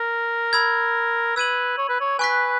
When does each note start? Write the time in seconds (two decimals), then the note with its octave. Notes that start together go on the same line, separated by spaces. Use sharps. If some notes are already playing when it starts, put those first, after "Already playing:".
Already playing: A#4
0.53 B5 E6 G#6
1.36 B4 E6 G#6 D#7 F#7
1.78 C#5
1.89 B4
2.01 C#5
2.19 B4 G#5 C#6 F#6 B6